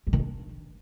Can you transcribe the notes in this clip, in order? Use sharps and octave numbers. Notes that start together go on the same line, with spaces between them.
G3
D#3
D4